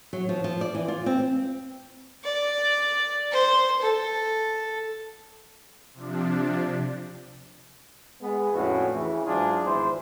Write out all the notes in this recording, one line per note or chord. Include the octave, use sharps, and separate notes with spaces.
F#3
F3
F3
D5
E3
F4
C4
D5
C5
A4
C3 F3 D4
G#3 B3
F2 A2 C#4 D4 E4 F#4
C#3 E3
G#2 F#3 D4 E4 F4 G#4
G#1 E2 E4 C5